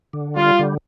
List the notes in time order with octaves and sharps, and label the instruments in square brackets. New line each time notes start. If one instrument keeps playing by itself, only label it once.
[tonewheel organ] D3
[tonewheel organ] G3 [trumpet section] F4
[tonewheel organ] D3